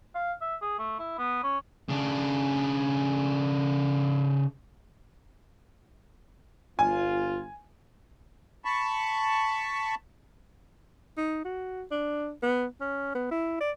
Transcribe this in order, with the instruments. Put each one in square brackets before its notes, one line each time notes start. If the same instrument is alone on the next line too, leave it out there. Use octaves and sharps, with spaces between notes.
[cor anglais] F5
E5
G#4
A3
E4
B3
C#4
[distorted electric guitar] C#3 D4
[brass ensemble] G1 F4 [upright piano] G#5
[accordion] A5 B5 C#6
[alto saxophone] D#4
F#4
D4
B3
C#4
B3
E4
D5